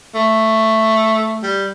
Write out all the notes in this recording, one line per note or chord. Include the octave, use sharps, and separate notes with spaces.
A3
G3